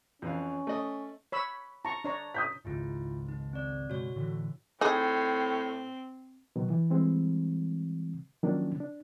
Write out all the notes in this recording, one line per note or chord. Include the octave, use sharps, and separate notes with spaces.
F2 E3 C#4 F5
A3 D#5
C#5 B5 E6
A5 A#5 C#6
D4 C#5 A#5
D#6 G6 B6
G#1 C#2 G#2 E4 F4
D#4
C4 D5
F#1 B2 G#3 F#4 C#5
A2 D3 E3
A2 C4 D#4 G#4
B2 D#3 F#3
E3
E3 G3 G#3 C4
D#3 F3 F#3 A#3 C#4 D4
D4